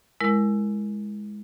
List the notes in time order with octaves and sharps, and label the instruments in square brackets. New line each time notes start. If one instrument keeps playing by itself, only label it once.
[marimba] G#3 E4 A#4